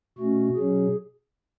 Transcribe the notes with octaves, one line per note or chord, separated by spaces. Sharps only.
B2 A3 C#4 F#4
B2 F#3 C#4 G#4